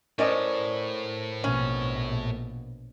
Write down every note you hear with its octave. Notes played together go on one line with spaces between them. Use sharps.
A2 C#4 A#4 C5 D5 D#5
A#1 B2 C#4